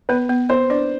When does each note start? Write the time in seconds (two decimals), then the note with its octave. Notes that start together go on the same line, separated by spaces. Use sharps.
0.09 B3 B4
0.29 B3
0.49 B3 C5
0.70 D4 D5